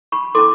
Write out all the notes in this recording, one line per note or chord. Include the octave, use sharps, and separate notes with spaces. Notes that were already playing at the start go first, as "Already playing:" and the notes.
B5 C#6
C#4 E4 A4 C6 D6